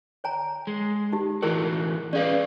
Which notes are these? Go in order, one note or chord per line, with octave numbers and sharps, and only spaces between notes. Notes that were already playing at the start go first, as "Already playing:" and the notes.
C#5 G#5 A#5
G#3
D#4 G4
A2 E3 E4 F#4 G#4 A#4
C#4 G#4 B4 D5 F5